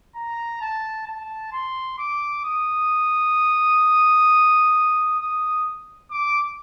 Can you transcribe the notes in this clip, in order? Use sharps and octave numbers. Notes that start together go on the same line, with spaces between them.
A#5
A5
A5
C6
D6
D#6
D#6
D6